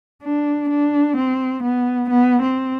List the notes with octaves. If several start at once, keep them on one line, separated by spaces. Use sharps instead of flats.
D4
D4
C4
B3
B3
C4